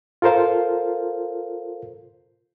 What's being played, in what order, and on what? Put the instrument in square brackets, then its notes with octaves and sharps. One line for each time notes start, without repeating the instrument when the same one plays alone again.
[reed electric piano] F4 A4 A#4 C5 F5